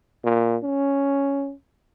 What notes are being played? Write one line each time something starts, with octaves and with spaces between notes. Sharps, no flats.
A#2
C#4